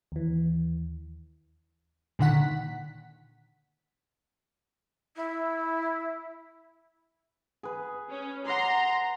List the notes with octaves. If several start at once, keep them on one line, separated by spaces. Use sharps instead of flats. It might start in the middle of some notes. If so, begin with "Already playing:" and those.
D#2 E3
A#2 D3 D#3 F#5 B6
E4
G#4 B4
C#4
D5 F#5 A#5 C6